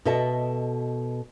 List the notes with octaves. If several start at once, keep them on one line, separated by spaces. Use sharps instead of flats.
B2 F#4 A4 D#5 E5 A5